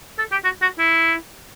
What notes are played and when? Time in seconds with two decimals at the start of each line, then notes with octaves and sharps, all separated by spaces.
0.19 A4
0.32 G4
0.44 F#4
0.62 F#4
0.79 E4